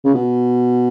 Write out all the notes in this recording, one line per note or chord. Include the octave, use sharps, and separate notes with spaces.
C#3
B2